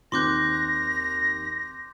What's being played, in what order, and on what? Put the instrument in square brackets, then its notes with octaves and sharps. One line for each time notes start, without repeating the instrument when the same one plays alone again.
[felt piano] D#2 C4 F#6 [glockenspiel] C6 D6 G6 [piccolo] A#6